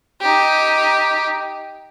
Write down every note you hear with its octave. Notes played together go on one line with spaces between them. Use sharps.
D#4 G4